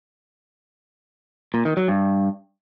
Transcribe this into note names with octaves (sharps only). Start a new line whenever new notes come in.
A#2
D#3
F#3
G2